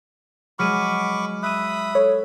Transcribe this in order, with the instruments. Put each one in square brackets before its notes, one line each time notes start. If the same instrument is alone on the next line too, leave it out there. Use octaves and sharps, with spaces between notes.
[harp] F#3 G#3 [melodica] B5 C#6 D6 [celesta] F6 D#7
[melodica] E5 B5 D#6 [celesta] F#6 D#7
[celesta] A4 [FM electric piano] C#5